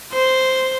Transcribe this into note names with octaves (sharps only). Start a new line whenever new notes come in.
C5